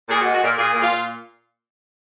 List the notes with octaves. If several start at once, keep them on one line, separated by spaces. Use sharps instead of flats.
A#2 G#4
F#4
G#3
F#4
A#2 A#4
A#2 G#4
A#2
F4
A#2